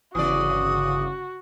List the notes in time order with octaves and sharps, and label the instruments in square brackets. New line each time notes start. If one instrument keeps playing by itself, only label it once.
[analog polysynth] G1 C#3 [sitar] E3 D5 [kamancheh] F#4 [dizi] D#6